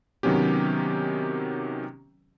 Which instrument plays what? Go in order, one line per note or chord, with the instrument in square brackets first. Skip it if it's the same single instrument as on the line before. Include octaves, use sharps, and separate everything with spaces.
[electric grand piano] C3 D#3 F#3 B3 C#4 G4